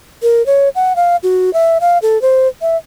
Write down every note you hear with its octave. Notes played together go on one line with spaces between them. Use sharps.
A#4
C#5
F#5
F5
F#4
E5
F5
A4
C5
E5